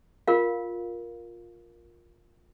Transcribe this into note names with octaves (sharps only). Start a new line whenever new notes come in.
F4 A#4 F5